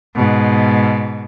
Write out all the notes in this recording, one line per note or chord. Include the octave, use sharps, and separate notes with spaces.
G#2 B2